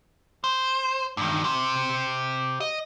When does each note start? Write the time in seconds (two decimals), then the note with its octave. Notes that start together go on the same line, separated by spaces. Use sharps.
0.44 C5
1.17 G2 D#3
1.44 G4 C5
2.60 D#5